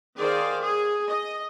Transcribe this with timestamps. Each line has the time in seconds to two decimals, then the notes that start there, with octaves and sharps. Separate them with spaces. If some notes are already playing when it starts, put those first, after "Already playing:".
0.16 D#3 G#4 C5 D5 F5
0.61 G#4
1.07 D#5